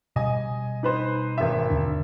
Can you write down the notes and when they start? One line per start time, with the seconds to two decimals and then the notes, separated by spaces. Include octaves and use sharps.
0.16 B2 G3 D#5 G#5
0.83 D#4 B4 C5
1.38 G#1 E5
1.70 D#2 D3 D4